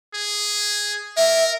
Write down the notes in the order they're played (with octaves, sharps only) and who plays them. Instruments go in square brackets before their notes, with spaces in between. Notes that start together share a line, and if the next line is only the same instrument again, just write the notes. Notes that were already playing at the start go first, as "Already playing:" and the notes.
[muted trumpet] G#4
[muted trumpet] A#4 [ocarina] E5